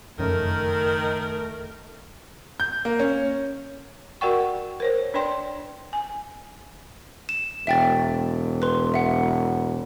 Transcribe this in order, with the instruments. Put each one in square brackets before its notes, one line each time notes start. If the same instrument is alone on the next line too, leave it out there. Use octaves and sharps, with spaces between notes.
[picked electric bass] F#1 F2 C#4 [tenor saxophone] D#3 [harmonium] A3 [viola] A#4
[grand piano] G6
A#3
C#4
[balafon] F#4 A#4 D5 F#5 G5 C#6
A#4 C5 C#5
D4 B4 C#5 D5 G5 C6
G#5
[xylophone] E7
[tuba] E1 [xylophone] E5 G5 A6
[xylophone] B4 C6
E5 F#5